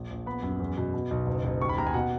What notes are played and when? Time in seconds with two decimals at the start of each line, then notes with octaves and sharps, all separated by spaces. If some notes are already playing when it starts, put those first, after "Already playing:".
Already playing: A#1
0.10 A#1
0.26 B3 B5
0.43 F#2
0.60 E2
0.77 B2
0.93 B2
1.11 B1
1.27 F#1
1.44 F#1
1.61 D#2 C#6
1.69 B5
1.78 D#2 A#5
1.87 G#5
1.94 B2 F#5